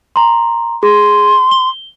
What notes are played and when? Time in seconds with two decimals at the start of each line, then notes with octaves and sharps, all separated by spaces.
0.16 A#5 C6
0.83 G#4 C6
1.51 G7